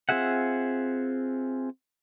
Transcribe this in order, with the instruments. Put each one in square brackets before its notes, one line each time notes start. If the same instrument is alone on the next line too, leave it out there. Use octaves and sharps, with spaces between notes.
[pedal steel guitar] C4 F4 G#4 E5 F#5